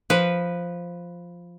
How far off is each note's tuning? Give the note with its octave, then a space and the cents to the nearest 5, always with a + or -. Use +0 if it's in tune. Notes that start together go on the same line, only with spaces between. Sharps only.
F3 +0 B4 +0